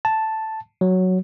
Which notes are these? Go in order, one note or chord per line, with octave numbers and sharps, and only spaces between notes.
A5
F#3